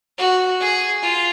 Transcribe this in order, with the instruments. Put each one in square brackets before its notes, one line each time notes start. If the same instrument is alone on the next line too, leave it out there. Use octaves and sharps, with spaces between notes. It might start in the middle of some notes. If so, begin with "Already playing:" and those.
[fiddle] F#4
G#4
F4